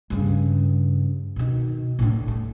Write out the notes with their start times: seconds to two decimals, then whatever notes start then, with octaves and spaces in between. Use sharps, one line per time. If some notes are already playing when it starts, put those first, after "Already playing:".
0.10 G2 C#3
1.36 B2 D#3
1.99 A2 D3
2.28 A3